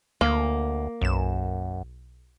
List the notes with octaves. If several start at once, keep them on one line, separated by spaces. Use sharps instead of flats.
D2 A#3
B1 F#2 E7